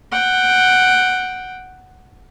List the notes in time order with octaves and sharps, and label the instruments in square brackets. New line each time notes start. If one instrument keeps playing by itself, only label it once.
[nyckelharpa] F#5 G5